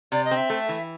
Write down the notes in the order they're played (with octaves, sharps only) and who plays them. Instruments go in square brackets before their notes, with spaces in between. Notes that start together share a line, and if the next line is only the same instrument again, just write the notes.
[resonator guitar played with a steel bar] C3 [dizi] D5
[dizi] D#5
[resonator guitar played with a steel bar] C4
[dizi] E5
[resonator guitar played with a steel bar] A3
E3